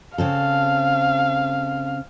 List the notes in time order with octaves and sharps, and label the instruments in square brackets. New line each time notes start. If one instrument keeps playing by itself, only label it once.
[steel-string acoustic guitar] C#3 C4 A4 [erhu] F5